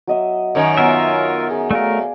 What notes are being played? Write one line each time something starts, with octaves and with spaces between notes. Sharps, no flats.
F#3 D#5 E5
F#2 D#3 A#4 C#5
B3 F4 A#4 E5
G#4
A3 A#4 D5 F5